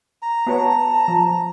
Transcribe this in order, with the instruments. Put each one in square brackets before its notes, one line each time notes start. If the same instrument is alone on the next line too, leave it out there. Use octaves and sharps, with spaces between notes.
[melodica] A#5
[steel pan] B3 F#4 C#5 [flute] A5
[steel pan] F3